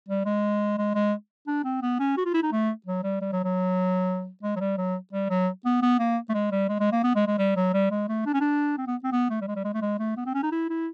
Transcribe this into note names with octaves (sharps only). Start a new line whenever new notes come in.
G3
G#3
G#3
G#3
D4
C4
B3
C#4
F#4
F4
E4
D#4
A3
F#3
G3
G3
F#3
F#3
G#3
F#3
G3
F#3
G3
F#3
B3
B3
A#3
A3
G#3
G3
G#3
G#3
A#3
B3
G#3
G#3
G3
F#3
G3
G#3
A3
D4
C#4
D4
C4
B3
C4
B3
A3
G3
G#3
G3
G#3
A3
G#3
A3
B3
C4
C#4
D#4
E4
E4